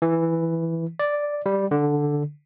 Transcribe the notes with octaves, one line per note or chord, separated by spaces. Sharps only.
E3
D5
G3
D3